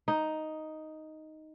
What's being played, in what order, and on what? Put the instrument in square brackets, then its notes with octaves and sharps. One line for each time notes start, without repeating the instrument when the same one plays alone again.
[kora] D#4